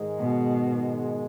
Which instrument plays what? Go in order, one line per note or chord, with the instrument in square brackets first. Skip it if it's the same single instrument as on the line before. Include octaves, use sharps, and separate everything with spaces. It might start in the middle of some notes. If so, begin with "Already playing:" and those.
Already playing: [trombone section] G#2 D#3 G#3
[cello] B2